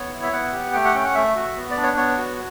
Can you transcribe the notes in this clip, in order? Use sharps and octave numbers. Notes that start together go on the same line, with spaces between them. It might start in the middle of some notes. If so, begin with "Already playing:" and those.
Already playing: B3 C#5
E4
E5
B3 F#5
G4
A3 G5
F#5
C#4 G5
F#5
A3 E5
F#4
B3
D5
D4
C#5
B3 C#5
F#4